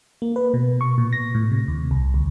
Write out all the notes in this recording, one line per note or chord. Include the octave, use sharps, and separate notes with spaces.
A#3
B4
B2
C#6
A#2
A#6
A2
C3
D#2
C2
D2